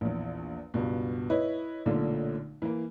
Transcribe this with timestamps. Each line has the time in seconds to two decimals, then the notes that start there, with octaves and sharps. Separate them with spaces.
0.01 A#1 E2
0.74 C#2 G2 B2
1.30 E4 B4 C#5 D#5
1.86 B1 A#2 D3 A3 F4
2.62 E3 A#3